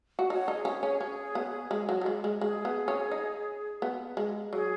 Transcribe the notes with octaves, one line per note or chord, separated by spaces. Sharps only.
F#4
D#4 C#5 F#5
D#4
G#4 C#5
C#4
G#4 C#5
C#4
C#4
B3
G#3
F#3
F#3
G#3
G#3
G#3 G#4
B3
C#4
D#4
B3
G#3
F#3 G#4